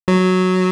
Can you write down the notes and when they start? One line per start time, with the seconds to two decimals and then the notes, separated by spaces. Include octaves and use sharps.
0.08 F#3